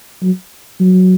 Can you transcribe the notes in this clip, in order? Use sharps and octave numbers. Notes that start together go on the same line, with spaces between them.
F#3
F#3